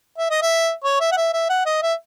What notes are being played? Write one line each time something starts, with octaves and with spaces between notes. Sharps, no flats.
E5
D#5
E5
C#5
E5
F#5
E5
E5
F#5
D#5
E5